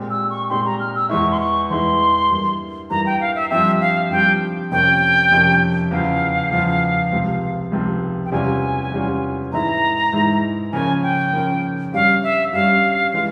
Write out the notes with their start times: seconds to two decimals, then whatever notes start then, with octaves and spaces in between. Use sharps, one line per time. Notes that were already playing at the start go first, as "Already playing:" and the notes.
Already playing: A#2 G#3 C4 G4
0.10 E6
0.30 C#6
0.50 A#2 G#3 C4 G4 C6
0.65 A#5
0.80 F6
0.95 E6
1.09 E2 E3 G#3 E4 C#6
1.31 C6
1.40 C#6
1.70 E2 E3 G#3 E4 C6
2.30 G2 E3 A#3
2.90 G2 E3 A#3 A#5
3.06 G5
3.21 F5
3.35 E5
3.50 G2 F3 C4 G4 E5
3.81 F5
4.11 G2 F3 C4 G4 G5
4.71 F2 C3 F3 A#3 C#4 G5
5.31 F2 C3 F3 A#3 C#4
5.91 E2 C#3 F3 F5
6.51 E2 C#3 F3
7.12 C#2 C3 F3 C4
7.72 C#2 C3 F3 C4
8.25 G5
8.32 E2 C3 G3 C#4 F4 G#5
8.92 E2 C3 G3 C#4 F4
9.52 G#2 E3 G#3 E4 A#5
10.13 G#2 E3 G#3 E4
10.72 C#3 F3 A#3 C#4 G#5
11.03 G5
11.33 C#3 F3 A#3 C#4
11.93 G2 G3 C#4 F5
12.23 E5
12.53 G2 G3 C#4 F5
13.14 E3 G#3